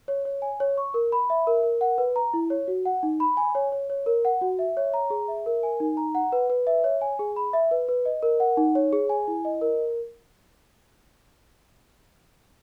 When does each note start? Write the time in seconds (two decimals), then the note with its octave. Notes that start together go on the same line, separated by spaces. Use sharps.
0.08 C#5
0.25 C#5
0.42 G#5
0.60 C#5
0.77 C#6
0.94 A#4
1.12 B5
1.30 E5
1.47 A#4
1.63 A#4
1.81 F#5
1.98 B4
2.16 A#5
2.34 E4
2.50 C#5
2.68 F#4
2.86 F#5
3.03 D#4
3.20 B5
3.37 G#5
3.55 C#5
3.72 C#5
3.90 C#5
4.06 A#4
4.25 F#5
4.41 F#4
4.59 E5
4.77 C#5
4.94 A#5
5.10 G#4
5.28 E5
5.46 A#4
5.63 G#5
5.80 D#4
5.97 A#5
6.15 F#5
6.32 B4
6.50 B4
6.67 E5
6.84 C#5
7.01 G#5
7.19 G#4
7.36 B5
7.53 E5
7.71 B4
7.89 B4
8.05 D#5
8.23 A#4
8.40 F#5
8.57 D#4
8.75 C#5
8.93 G#4
9.09 G#5
9.28 E4
9.45 D#5
9.61 A#4